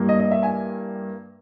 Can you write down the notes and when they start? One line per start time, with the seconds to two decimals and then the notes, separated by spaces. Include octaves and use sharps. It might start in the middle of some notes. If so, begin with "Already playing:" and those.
Already playing: G2 G3 A#3 E4
0.09 D#5
0.20 D#5
0.31 E5
0.43 G#5